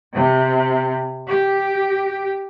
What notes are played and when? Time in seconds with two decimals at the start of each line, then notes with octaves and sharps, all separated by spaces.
0.13 C3
1.28 G4